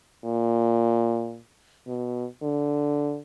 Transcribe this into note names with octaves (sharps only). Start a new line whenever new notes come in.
A#2
B2
D3